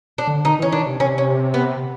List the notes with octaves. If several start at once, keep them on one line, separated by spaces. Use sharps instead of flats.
D4
D3
D#3 D#4
E3 C#4
D#3 D4
C3
C3 C#4
C#4
B3